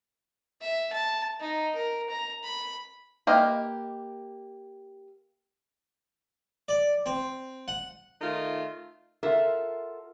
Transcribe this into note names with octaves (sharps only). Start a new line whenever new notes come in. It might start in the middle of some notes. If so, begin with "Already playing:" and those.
E5
A5
D#4
A#4
A#5
B5
A#3 G4 B4 D#5 F5
D5
C4
F#5
D#3 A3 D#4 F4
F4 F#4 A4 A#4 E5